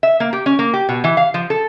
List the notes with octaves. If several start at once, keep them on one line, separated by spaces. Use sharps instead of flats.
E5
A#3
G4
C#4
A#3
G4
B2
E3
F5
F3
A4